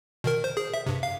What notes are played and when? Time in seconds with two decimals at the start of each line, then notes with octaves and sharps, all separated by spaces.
0.24 B2 D#3 A#4
0.44 C5
0.57 G#4
0.74 E5
0.86 G2 C3
1.03 F5